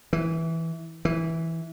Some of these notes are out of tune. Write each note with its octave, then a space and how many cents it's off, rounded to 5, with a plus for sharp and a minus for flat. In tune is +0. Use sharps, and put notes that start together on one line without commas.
E3 -10
E3 -10